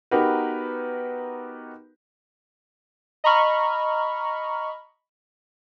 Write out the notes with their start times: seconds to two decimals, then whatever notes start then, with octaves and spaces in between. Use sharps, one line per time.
0.11 B3 D#4 F#4 G4 A#4 B4
3.24 D#5 A#5 B5 C#6 F6